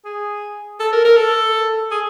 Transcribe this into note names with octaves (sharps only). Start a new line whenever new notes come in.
G#4
A4
A#4
A#4
A4
G#4